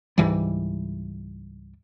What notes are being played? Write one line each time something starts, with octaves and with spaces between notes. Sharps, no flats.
C#2 G#2 E3 G3